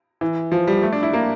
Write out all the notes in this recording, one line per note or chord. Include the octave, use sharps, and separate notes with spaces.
E3
F3
G3
A3
D4
E4
A#3